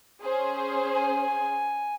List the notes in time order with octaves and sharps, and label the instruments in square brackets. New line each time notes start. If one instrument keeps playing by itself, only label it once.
[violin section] C#4 G#4 C5
[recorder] G#5